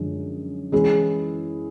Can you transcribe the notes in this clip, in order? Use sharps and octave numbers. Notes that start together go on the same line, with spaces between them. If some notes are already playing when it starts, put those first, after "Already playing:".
Already playing: F#2 D3 F3 G#3
E3 G#3 C#4 E4 G#4